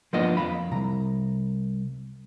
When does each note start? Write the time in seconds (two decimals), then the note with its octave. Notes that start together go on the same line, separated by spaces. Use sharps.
0.13 F3 A#3 B3 D4 F4 D#5
0.37 F2 C3 F5 B5
0.72 C2 A#5